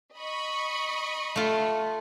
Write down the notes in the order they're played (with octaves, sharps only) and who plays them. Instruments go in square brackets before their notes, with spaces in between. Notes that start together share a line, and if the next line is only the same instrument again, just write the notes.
[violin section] D#5 B5 C#6
[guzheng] A3 F4